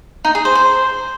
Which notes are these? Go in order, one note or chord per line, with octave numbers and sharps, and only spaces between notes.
D#4
G#4
C5
C5